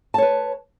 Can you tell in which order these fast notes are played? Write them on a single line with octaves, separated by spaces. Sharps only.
A5 C#5 B4